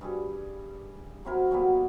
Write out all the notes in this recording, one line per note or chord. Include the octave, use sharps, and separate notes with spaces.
G2 G3 G#4
F#3 C4 E4 A#4
F#3 G3 A#3 B3